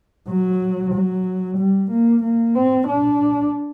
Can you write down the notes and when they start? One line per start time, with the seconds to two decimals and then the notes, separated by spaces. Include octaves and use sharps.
0.29 F#3
0.93 F#3
1.57 G3
1.91 A#3
2.23 A#3
2.55 C4
2.88 D4